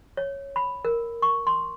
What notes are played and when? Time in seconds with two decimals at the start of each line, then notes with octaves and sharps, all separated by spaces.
0.17 C#5
0.56 B5
0.85 A#4
1.22 C#6
1.47 C6